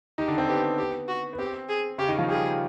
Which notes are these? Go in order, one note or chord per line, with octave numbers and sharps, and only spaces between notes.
D#3 D#4 G4
D3 D4
C4
B3 G4
G4
F#4
B3
C4 G4
G#4
C#3 C#4 G4
D#3 D#4
F3 F4
G3 G4 G#4